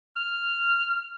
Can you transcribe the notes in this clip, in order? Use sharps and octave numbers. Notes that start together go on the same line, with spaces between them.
F6